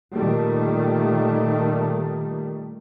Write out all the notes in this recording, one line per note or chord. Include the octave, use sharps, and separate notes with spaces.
A#2 D#3 G3 A3